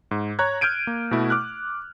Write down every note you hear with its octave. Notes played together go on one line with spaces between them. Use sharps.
G#2
C#5 A#5 F#6 G#6
F6 G6 G#6 D7 D#7
A#3
B2 A3 E4
D6 F6 F#6